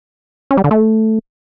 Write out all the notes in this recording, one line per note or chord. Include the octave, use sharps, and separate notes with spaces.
C#4
G3
D3
A3